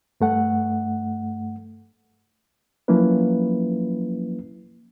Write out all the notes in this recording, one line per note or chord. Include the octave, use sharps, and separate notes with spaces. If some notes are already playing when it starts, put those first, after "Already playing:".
G2 A3 F#5
F3 F#3 A#3 C#4 E4 B4